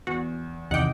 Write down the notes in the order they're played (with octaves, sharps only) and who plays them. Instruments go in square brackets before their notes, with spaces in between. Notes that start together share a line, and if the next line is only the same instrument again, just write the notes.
[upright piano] E2 [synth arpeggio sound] F#4
[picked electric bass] E2 D#3 [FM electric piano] C3 D6 [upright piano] D#5 [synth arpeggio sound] F#5 G5